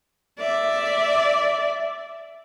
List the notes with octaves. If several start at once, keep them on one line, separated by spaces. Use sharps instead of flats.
D5 E5